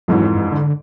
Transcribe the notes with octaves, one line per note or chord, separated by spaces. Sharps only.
F2 G#2 E3 F#3
G2
D3